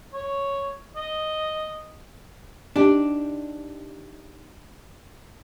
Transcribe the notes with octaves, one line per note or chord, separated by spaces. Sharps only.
C#5
D#5
D4 D#4 G4